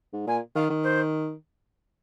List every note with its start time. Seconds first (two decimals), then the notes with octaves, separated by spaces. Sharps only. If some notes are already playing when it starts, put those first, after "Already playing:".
0.13 G#2
0.27 A#2 G#5
0.55 D#3 F5
0.70 D#3
0.84 C5